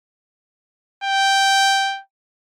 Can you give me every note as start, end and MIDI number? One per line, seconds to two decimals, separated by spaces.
1.04 2.01 79